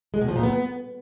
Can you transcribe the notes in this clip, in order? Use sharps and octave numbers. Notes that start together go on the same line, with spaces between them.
G#3
B2
F3
A#2
B3